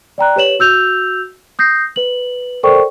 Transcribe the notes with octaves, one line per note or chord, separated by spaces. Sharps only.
D5 G5 A#5 F#6
G4 B4 C#5 E7 F#7
F#4 E6 G6 F7
D#6 G6 A#6 C7
B4 F#7
A4 A#4 C5 D5 G5 C#6